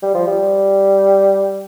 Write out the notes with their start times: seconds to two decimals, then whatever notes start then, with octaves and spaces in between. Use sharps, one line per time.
0.02 G3
0.14 F3
0.27 G3